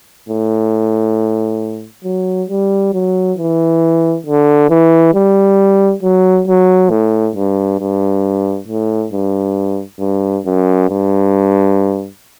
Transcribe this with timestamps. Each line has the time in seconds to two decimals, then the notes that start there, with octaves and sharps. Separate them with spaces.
0.29 A2
2.04 F#3
2.50 G3
2.93 F#3
3.38 E3
4.26 D3
4.70 E3
5.14 G3
6.03 F#3
6.47 F#3
6.90 A2
7.35 G2
7.80 G2
8.67 A2
9.12 G2
10.00 G2
10.45 F#2
10.89 G2